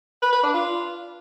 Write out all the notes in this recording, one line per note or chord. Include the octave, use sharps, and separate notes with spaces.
B4
B4
D4
F4